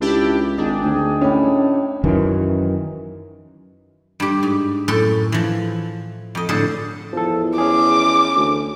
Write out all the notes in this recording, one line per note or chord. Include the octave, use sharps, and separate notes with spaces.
C#2 D4 E4 G4
G#1 D4 D#4 G4 G#4
D2 G#4 G5
A2 G3 C#4
F#2 D#3 E3
G2 G4
G#2
F#2 A2 A4 G5
E3 F3
F2 D#5
A2 D3 G#4 A4 C5
E2 F3 A4
C#4 G#4 D6
D2